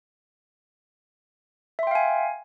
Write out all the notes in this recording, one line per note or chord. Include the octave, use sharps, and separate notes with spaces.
E5 F5 G5 G#5 C6